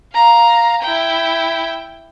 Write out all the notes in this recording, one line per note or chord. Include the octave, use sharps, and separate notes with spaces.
F5 A#5
E4 G5